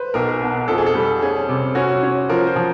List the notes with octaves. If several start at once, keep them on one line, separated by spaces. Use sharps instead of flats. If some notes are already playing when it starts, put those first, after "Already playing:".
Already playing: B4 C5
B1 A#4
B2
F2 A4
G#4
A4
G3
C#4 G#4
C3
C#4 F#4
C#4
F3 A#4
C5
F3